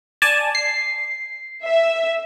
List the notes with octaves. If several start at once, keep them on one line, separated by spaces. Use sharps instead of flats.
D5 G#5 A5
C7
E5